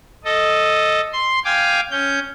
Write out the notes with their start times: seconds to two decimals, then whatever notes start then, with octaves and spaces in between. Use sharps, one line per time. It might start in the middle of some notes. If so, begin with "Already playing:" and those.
0.25 A4 D#5
1.13 C6
1.45 F5 G5 G#5 D6
1.91 C#4 G6